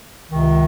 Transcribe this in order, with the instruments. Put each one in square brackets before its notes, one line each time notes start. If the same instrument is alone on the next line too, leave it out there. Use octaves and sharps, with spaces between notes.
[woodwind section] C#2 C3 D#3